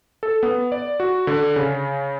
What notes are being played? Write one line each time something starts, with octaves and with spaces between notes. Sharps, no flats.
A4
B3
D5
F#4
D3
C#3